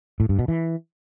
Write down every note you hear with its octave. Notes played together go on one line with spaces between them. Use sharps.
A2
G2
B2
E3